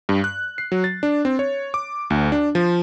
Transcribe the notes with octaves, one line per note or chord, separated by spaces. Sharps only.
G2
F#6
C7
F#3
A6
D4
C4
C#5
D6
D2
D4
F3